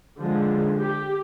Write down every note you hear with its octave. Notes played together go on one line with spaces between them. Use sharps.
D3 F3 G#3
G4